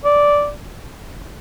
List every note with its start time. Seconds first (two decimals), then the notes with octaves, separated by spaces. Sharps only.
0.05 D5